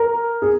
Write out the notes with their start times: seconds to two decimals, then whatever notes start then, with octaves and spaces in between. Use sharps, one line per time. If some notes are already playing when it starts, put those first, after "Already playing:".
Already playing: A#4
0.42 G#4